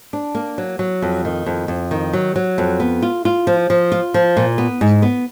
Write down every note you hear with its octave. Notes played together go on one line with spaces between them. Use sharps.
D4
A#3
F#3
F#3
F2
D#3
F2
F2
D#3
F#3
F#3
F2
B3
F4
F4
F3
F3
F4
F3
A#2
B3
G#2
B3